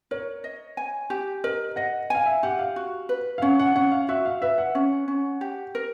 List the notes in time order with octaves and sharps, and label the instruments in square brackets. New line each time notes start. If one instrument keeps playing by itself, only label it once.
[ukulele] A#4 [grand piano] C#5
[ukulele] D#5
G#5
G4
[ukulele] A#4 [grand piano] D#5
[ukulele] D#5 [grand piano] F#5
[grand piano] F5 [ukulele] G#5
[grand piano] E5
[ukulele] G4 [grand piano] F#5
[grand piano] F5
[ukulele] F#4
B4
[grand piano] F5
[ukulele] C#4 [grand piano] F#5
[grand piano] F#5
[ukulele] C#4 [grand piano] F#5
[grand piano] F5
[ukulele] F#4 [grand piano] E5
[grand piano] F5
[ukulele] B4 [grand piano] E5
[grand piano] F#5
[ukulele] C#4
C#4
G4
A#4